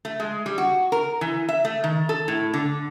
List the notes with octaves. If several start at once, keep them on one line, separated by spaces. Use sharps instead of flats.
A3
G#3
G3
F#4
A#4
E3
E5
A3
D#3
A4
A2
D3